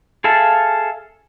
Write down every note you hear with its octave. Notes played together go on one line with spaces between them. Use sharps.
G#4 A4 E5 F5 A5